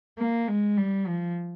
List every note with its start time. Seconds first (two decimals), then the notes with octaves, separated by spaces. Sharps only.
0.18 A#3
0.48 G#3
0.77 G3
1.07 F3